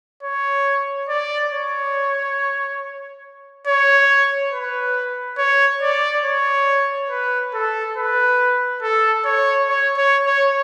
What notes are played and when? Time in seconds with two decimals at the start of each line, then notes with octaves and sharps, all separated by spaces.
0.23 C#5
1.09 D5
1.52 C#5
3.67 C#5
4.52 B4
5.38 C#5
5.82 D5
6.25 C#5
7.10 B4
7.54 A4
7.97 B4
8.83 A4
9.25 C#5
9.69 C#5
9.97 C#5
10.26 C#5